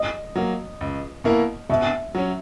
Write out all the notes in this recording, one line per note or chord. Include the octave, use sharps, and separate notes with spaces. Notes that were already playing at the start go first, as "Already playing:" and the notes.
Already playing: D#5
F#3 A#3
C#2
B2 A#3 E4 A#4
B2 E5
F#3 C#4